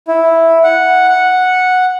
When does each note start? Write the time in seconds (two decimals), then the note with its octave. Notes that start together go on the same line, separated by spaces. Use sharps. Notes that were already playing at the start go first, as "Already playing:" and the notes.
0.08 E4
0.64 F#5
1.09 F#5